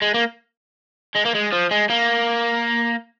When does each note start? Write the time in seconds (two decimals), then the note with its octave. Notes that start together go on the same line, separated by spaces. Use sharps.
0.02 G#3
0.14 A#3
1.15 G#3
1.25 A#3
1.34 G#3
1.52 F3
1.71 G#3
1.90 A#3